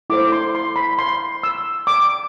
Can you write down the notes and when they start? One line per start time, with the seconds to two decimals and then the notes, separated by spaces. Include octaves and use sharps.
0.10 E4 A4 C5 D6
0.32 C6
0.55 C6
0.76 B5
0.99 C6
1.43 E6
1.87 D6